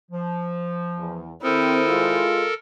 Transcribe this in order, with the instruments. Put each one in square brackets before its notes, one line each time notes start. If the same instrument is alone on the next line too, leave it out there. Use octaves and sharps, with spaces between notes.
[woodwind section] F3
[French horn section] E2
[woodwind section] D#3 C5 D#6 [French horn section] C4 [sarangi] E4 [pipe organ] A4 A#4
[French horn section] G#3 F4 G#4